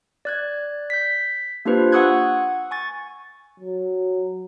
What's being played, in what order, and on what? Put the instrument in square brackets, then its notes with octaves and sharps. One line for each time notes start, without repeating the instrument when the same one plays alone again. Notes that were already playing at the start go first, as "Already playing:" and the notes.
[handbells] D5 F#6 G#6
G6 B6
A#3 D4 F4 G4 B4 C5
F#5 C#6 D#6 E6 F#6 G#6
G#5 C#6 A6
[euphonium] F#3